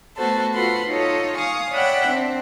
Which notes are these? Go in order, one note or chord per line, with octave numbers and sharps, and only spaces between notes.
A3 B3 F#4 A4 C5
F4 F#4 A4 B4 F#5 C6
D#4 F4 A4 C#5 D#5
F5 G#5 C#6 D#6
C#5 D5 E5 F#5 G5 B5
C4 D4